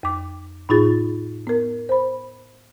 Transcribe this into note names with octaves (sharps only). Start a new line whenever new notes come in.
F2 D6
A2 D#4 F4 G#4 A6
B3 A#4
C5 B5